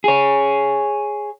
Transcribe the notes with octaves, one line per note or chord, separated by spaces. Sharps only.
G#4 C#5